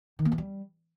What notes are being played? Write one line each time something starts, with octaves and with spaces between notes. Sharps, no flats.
D#3
A#3
E3
G3